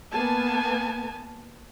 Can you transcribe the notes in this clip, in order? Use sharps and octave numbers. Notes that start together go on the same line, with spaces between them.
A#3 B3 G#5 A5